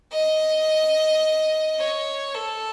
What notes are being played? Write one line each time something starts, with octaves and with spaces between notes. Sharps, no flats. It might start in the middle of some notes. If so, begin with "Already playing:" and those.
D#5
C#5
A4